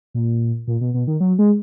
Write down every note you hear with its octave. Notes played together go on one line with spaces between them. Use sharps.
A#2
A#2
B2
B2
D#3
F#3
G#3